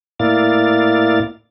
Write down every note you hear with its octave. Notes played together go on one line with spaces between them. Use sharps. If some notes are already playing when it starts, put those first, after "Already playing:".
A2 A#3 E4 D5 F5 A6